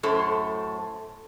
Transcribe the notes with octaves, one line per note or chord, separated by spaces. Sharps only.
F#2 A2 A4 C5